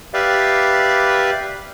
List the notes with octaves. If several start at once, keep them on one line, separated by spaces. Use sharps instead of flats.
G4 B4 D5 E5 F5